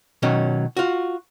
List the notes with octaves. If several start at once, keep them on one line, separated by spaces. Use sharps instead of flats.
B2 D#3 F#3 C#4
F4 F#4